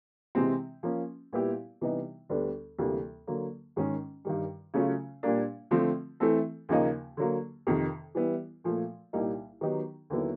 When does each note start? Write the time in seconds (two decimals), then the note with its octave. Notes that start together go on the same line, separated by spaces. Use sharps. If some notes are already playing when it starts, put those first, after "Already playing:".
0.35 C3 E3 G#3 C4
0.83 F3 A#3 C#4
1.33 A#2 G3 B3 E4 G4
1.81 C3 E3 G3 B3 D#4
2.29 D2 D3 G3 B3 D4
2.79 D2 C3 E3 G3 A#3
3.27 D3 F#3 A#3
3.76 G#2 D#3 G#3 C#4
4.25 G2 D#3 G3
4.74 C#3 F#3 A3 C#4 F4
5.23 A#2 G3 A#3 D4
5.71 D3 F3 A3 C4
6.20 E3 A3 C4 E4 A4
6.69 D#2 C#3 F3 A#3 D#4
7.17 D3 F#3 A#3
7.67 F2 C3 D#3
8.15 E3 G3 B3 E4
8.64 A#2 F3 A3
9.13 C2 A#2 G3 A#3 D#4
9.61 D#3 F#3 B3 D#4 G4
10.10 D#2 D3 F#3 B3 E4